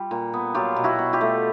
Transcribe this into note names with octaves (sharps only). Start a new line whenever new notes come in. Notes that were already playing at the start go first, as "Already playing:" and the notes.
Already playing: G3 F4 G4
A#2
B3
F#3 F4 G4
B2
E4 F#4
B2
F4 G4
A3